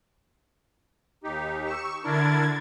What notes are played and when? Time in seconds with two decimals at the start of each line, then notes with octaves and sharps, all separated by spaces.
1.24 D#2 D#4 G4
1.64 C#6 E6
2.04 D3 D4 E4 A#4 G#6 A6